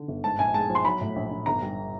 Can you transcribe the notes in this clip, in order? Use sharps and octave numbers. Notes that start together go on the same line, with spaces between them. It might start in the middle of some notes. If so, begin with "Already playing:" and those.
Already playing: D3
G1
G#2 A5
A#1 G#5
G#3 A5
F3
C6
F#3 B5
A2
A#1
A#1
G1 A#5
G3